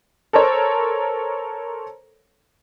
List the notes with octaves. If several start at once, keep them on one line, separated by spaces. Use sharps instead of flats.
A4 A#4 C5 C#5